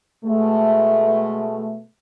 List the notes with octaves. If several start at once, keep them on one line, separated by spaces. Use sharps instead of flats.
B2 G#3 A3